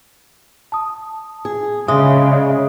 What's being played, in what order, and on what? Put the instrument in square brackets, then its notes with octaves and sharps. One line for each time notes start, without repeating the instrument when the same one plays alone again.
[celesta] A5 D#6
[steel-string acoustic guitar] G#4
[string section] C#3 [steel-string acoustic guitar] G#3 [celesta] E5 D#6
[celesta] D5 E5